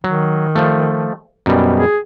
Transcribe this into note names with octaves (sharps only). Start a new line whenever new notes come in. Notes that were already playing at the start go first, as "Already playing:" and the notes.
D#3 F#3
F3 A3
F#2 B2 G3
G#4